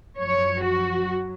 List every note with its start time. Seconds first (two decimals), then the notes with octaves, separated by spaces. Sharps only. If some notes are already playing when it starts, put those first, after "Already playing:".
0.18 F#2 F3 C#5
0.62 F#4
1.06 F#3